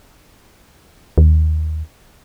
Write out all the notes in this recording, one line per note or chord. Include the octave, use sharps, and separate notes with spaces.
D#2